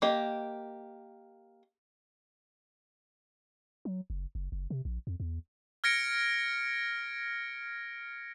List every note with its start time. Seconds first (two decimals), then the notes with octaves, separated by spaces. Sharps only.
0.02 A#3 G4 D#5
3.85 F#3
4.10 F#1
4.35 F#1
4.52 F#1
4.70 C3
4.85 A#1
5.07 F2
5.20 E2
5.84 F6 G#6 A#6 C#7 D7